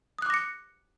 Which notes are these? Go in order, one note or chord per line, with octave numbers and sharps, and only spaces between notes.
D6 D#6 F#6 A#6 C#7